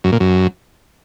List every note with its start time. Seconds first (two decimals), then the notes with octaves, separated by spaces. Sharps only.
0.04 F#2
0.12 A#2
0.20 F#2